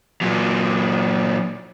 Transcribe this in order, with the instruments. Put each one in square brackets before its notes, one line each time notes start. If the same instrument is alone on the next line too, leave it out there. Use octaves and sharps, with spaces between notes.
[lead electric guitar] A#2 F#3